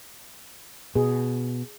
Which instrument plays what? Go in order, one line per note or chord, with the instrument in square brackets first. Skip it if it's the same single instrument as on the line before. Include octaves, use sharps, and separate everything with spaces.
[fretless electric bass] B2 [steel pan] G#4